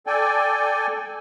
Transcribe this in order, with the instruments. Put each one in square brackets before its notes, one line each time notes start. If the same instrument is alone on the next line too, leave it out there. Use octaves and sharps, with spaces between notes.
[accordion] A4 D5 G5 G#5